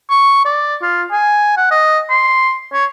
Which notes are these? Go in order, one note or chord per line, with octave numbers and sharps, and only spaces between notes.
C#6
D5
F4
G#5
F#5
D#5
C6
C#5